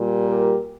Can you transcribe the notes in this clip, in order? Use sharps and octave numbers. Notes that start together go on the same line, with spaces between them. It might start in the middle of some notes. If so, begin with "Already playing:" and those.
Already playing: A#2 G3
G4 A#4